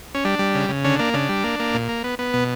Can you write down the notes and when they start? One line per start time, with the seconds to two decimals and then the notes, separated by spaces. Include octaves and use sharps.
0.15 C#4
0.24 G3 D4
0.39 G3
0.55 C#3
0.69 C#3
0.84 D3 C#4
0.99 A#3 D4
1.14 C#3 D4
1.29 G3
1.44 A#3
1.59 A#3
1.74 A#2
1.89 A#3
2.04 B3
2.19 B3
2.34 B2